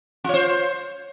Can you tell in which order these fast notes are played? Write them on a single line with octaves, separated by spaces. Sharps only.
F4 C#5 C5